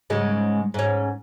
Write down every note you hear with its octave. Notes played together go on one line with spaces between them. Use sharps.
G#2 C#3 G#3
G#2 C#4